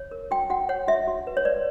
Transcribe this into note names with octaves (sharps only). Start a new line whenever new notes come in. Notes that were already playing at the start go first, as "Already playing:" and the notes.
Already playing: C#5
A#4
F#4 G5
F#4 F#5
C#5 F#5
F#4 E5
F#4
B4
C#5
B4 D5